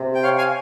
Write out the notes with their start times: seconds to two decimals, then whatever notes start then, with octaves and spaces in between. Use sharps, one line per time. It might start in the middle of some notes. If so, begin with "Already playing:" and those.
Already playing: C3
0.15 G5
0.23 C#5 F5
0.38 F5 G#5